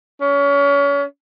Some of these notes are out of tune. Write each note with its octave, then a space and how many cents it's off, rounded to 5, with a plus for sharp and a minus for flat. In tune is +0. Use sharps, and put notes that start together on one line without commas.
C#4 +30